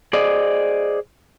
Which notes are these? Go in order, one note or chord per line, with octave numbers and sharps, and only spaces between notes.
G#4 C5 D5 D#5